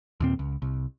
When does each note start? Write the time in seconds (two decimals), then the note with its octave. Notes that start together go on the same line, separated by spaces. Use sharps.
0.20 D#2 A#2 C4
0.39 C#2
0.62 C2